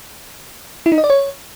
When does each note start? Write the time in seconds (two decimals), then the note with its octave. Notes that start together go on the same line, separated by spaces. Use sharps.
0.86 E4
0.92 D#4
0.98 D#5
1.04 D5
1.10 C#5